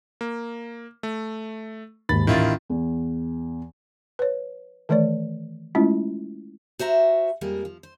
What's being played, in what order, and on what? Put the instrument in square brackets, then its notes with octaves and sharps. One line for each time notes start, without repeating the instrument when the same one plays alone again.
[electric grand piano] A#3
A3
[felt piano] D#2 G#2 [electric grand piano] B5 A6
[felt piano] A1 [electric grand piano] D#3 E4 F4
[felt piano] E2
[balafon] B4 C#5
D#3 E3 A3 C#5 D5
G#3 A3 C#4 E4 F4
[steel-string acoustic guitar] F#4 C5 E5 A#5
F2 G3 G#3 A#3
F3
C5